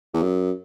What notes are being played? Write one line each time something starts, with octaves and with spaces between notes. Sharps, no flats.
E2
F#2